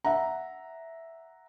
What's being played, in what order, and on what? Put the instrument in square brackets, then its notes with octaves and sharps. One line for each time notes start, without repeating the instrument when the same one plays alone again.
[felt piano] E5 F#5 A#5